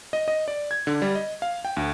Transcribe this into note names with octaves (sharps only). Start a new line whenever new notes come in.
D#5
D#5
D5
G#6
D3
G3
D#5
F5
G5
D2